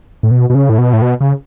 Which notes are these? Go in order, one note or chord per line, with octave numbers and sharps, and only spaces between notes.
A2
B2
B2
C#3
A2
B2
A2
B2
C#3